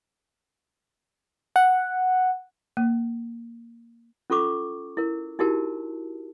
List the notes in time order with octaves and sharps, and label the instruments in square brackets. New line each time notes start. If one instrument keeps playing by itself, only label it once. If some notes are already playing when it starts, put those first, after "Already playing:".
[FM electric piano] F#5
[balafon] A#3
[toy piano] C#4 F4 A4 C#6 D6
E4 A#4
D#4 E4 F#4 G4 A#4 A5